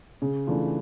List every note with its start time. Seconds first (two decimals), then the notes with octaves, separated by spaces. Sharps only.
0.22 C#3
0.47 E3 A3 D4 F4